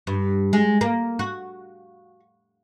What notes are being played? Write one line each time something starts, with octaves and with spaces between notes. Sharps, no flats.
G2
G#3
A#3
F#4